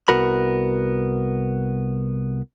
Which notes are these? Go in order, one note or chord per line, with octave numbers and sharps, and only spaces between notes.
C2 B3 F#4 A#4 B5